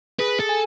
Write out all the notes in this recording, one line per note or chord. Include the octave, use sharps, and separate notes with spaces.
G#4 B4
A4
G#5